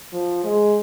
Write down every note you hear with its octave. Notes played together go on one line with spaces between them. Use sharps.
F3
G#3